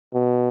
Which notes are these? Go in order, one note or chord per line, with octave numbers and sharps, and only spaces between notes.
B2